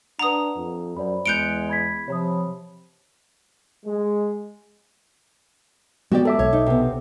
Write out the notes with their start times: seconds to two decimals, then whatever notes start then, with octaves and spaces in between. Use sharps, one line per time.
0.19 D4 B4 F#5 A#5 D#6
0.56 F2
0.97 F#2 C5 D5 B5
1.26 E2 G#3 F#6 G6 C#7 D7 F7 G7
1.69 B5 G#6 B6
2.08 C3 F3 C#5 B5 D#6
3.85 G#3
6.11 G#3 B3 F#4 G4 D5
6.25 F#2 A4 E5 D6
6.39 B1 C#5
6.53 D#4
6.66 C3 B3